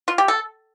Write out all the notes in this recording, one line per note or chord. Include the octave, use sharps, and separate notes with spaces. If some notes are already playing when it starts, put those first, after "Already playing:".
F4
G4
A4